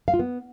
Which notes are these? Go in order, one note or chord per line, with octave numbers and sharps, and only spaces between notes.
F5
F4
B3